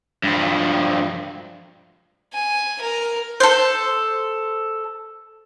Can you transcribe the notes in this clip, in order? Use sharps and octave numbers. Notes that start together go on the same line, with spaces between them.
G2 F3
G#5
A#4
A4 C5